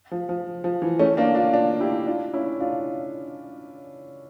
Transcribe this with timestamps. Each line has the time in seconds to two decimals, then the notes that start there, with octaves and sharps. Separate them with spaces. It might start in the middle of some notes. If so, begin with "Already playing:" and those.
0.11 F3
0.29 F3
0.64 F3
0.82 E3
0.99 A3 C#4
1.17 A#3 D4
1.35 D4 F4
1.53 D4 F4
1.80 E4 G4
2.07 D4 F4
2.34 C#4 E4
2.60 D4 F4